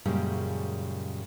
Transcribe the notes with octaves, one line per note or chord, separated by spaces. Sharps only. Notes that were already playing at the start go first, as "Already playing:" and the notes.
F#2 A#2 C#3 G3 G#3